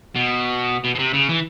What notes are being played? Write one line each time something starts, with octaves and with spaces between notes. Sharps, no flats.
B2
B2
B2
C3
C#3
E3